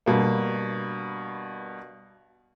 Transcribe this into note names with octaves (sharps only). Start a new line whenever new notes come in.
G2 B2 A#3